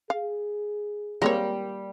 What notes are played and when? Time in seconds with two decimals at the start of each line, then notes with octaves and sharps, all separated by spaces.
0.10 G#4 F5
1.22 G3 G#3 A#3 C4 C#5 A#5